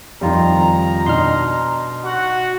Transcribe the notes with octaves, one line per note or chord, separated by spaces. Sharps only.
F2 D#3 G3 F4 A#5
B2 D4 D#4 C6 F6
F#4 F#5